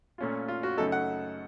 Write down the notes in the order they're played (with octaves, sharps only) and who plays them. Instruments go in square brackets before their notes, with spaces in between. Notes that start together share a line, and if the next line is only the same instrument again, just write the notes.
[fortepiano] A#2 A3 C#4 F4
F4
F#4
F#2 C#3 A3 D#4 A4
F#5